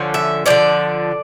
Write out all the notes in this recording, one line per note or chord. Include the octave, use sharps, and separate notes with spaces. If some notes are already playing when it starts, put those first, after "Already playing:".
Already playing: D3 F3 C#4
E5
D3 F3 C#4 D5